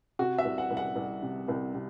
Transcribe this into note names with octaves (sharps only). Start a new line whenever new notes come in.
C3 F#4
E5
C2
F#5
C2
F#5
C2
C3
C2
C3